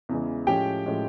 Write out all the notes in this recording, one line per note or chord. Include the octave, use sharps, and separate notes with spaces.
E2 C#3 E3 G#3
A2 F3 G#3 C#4 G4 G5
A2 F3 G#3 C#4